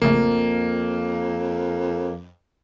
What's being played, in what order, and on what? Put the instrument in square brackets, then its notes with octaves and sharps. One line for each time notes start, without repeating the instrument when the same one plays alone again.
[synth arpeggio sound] A#1 C#3 A3 [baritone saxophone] F2 [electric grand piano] A#3